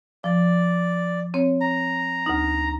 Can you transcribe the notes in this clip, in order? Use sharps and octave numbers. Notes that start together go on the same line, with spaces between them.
F3 D5
C4 C#5
A#5
D2 D#4